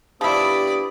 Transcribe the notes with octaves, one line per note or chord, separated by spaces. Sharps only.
F3 B3 D4 E4 G4 D5 B5 D#6